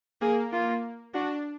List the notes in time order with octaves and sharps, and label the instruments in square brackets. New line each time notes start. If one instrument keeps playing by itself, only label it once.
[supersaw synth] A#3 [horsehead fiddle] G#4
[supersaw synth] A#3 [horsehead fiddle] F4
[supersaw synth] D4 [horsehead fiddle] F#4